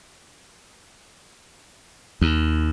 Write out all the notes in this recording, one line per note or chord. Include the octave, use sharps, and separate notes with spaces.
D#2